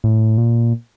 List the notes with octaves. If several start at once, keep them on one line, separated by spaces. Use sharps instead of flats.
A2
A#2